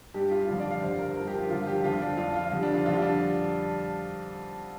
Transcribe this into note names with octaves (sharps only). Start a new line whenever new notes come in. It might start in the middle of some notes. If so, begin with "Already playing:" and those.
G2 G3 G4
F4
F2 D3 G3 F4
D5
F5
G2 D3 G3 C5
A#4
G2 F3 A#4
G4
F4
G2 D3 F3 F4
G4
F2 D3 F3 F4
D4
F2 F3 F4
F4
F2 D3 G3
D4
F4
F2 D3 G3 F4
D4